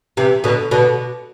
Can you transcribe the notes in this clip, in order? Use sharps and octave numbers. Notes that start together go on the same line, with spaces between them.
C3 E3
B2 D3
B2 D3